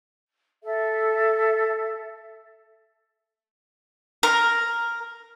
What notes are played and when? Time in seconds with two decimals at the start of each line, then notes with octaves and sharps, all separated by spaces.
0.63 A4 E5
4.23 A#4